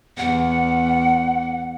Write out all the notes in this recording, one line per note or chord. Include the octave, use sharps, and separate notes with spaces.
E2 F#5